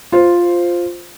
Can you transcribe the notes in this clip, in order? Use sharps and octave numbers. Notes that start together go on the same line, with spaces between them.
F4 C5